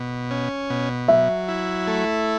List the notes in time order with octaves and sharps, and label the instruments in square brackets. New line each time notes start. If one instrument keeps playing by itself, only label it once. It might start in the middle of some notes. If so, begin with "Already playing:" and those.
Already playing: [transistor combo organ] B2
C#4
B2
[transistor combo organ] F#3 [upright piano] E5
[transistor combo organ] E4
A3